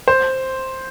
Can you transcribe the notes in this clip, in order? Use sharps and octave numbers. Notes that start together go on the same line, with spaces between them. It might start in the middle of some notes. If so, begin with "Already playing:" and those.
C5